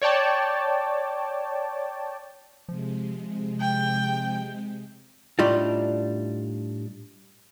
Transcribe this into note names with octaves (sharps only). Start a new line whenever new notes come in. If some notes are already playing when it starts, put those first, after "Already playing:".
C#5 D5 G5 A5
C3 F3 G#3
G5
A2 G3 D4 D#4 F4